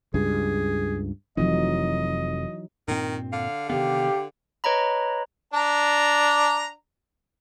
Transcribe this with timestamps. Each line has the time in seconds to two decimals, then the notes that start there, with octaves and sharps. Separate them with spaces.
0.14 C#2 G2 G#4
1.37 F1 F2 E3 F#3 D#4 D#5
2.88 G2 A#2 D#3 C4
3.33 D3 F5
3.70 C3 D#3 B3 G4 F5
4.64 B4 C#5 D#5 A#5 B5
5.53 D4 A#5